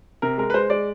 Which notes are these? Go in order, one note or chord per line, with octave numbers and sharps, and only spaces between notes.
C3 A#4
G#3 A#4
B4
G#3 C5
G#3 D5